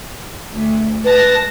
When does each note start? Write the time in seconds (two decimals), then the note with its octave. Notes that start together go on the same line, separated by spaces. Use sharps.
0.51 D2
1.04 G#3 B4 A5 A#6